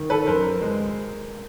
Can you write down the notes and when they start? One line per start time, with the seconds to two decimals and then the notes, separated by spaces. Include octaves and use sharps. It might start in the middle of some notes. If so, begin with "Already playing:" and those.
Already playing: D#3
0.10 A4 B4
0.27 F#2 A#4 C5
0.61 G#3